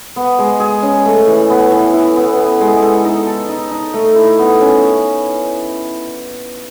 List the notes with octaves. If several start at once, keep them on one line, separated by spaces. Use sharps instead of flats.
B3
G#3
G#4
C#4
A3
E3
B3
E3
E4
B3
B3
G#3
A4
D#4
A4
D#4
D#4
A3
E4
B3
C#4